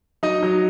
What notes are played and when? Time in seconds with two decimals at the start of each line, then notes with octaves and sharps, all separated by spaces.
0.23 F#3 D#4 D#5
0.43 F#3